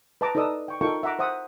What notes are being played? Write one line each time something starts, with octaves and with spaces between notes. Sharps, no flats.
B4 D#5 A5 A#5 D6
D#4 A4 B4 D5 D#6 E6
G5 C#6
D#4 F4 A4 A#4 G5 C#6
E5 F#5 A#5 D6
C5 E5 F#5 D#6